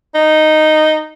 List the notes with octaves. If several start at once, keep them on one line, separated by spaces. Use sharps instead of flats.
D#4